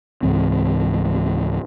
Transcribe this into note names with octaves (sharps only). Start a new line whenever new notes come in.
C#2 G#2 E3 C4